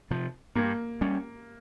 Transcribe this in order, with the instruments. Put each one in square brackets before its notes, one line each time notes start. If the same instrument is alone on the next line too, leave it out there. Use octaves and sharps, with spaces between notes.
[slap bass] C3 F3
[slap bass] G2 [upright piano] A#3
[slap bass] G3 C#4